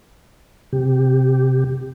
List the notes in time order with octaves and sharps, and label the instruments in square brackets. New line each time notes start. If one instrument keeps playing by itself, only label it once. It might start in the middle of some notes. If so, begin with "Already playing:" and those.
[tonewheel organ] C3 G4